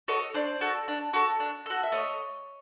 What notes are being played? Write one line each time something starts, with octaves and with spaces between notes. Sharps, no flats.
F#4 A4 C#5 D#5
D4 C5 D5
F#4 A4
D4
F#4 A4
D4
F#4 A4
E5
A3 C#5 D#5